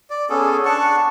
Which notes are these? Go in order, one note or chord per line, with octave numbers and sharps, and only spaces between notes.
D5
B3 C#4 G#4 A4
D4 F#5 A5 C#6